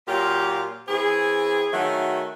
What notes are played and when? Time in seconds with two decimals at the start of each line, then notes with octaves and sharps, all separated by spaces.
0.07 A#2 F#3 F4 G4
0.88 E3 C4 G#4
1.72 D#3 F#3 A3 F#4 G#4